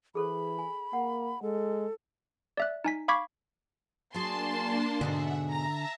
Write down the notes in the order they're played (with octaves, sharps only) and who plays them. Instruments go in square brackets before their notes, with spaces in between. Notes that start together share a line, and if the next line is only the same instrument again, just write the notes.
[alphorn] E3 [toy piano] G#4 A4 C5 [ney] B5
[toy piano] G#5
[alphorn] A#3 [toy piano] F#5
[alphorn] G#3 [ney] A4
[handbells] D5 E5 F#6
D#4 G#5 B6
F5 B5 C#6 D6 G#6 B6
[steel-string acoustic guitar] F#3 G#4 [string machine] A#3 D4 [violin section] A5 C6
[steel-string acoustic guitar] G#2 B2 G#4 [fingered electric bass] D3 [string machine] E5 F#5
[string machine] E5 A5 [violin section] A#5